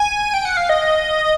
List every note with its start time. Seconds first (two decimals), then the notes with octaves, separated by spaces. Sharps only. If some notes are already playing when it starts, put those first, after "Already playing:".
Already playing: G#5
0.34 G5
0.45 F#5
0.57 F5
0.69 D#5